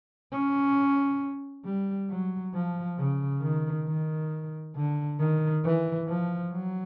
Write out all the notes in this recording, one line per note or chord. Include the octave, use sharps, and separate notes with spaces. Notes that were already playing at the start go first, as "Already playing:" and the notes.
C#4
G3
F#3
F3
C#3
D#3
D#3
D3
D#3
E3
F3
F#3